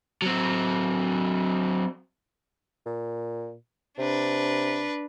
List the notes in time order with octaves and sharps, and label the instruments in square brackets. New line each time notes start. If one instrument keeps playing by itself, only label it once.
[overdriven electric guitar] F#3 C4
[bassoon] A#2
[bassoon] C3 [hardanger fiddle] D4 B4